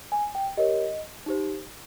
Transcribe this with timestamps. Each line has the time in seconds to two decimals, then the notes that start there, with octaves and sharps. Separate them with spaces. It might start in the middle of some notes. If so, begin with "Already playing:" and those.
0.12 G#5
0.35 G5
0.57 G4 A#4 C#5 D#5
1.26 D#4 G4 C5